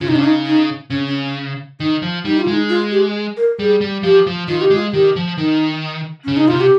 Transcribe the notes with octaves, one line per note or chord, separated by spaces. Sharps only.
C#3 F4
C3 D#4
C#4
C#3
D#4
D#4
C#3 C#4
C#4
D#3 D#4
F3
G3 D#4
F4
G#3 D#4
F4
G4
A#4
G3 G#4
G3
F3 G4
F3
D#3 F4
G4
G#3 F4
D#3 G4
F3
D#3 D#4
C#3 C#4
D#4
C3 F4
G4